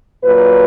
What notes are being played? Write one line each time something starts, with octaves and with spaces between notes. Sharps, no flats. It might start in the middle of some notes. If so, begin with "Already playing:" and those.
A#2 F#3 B4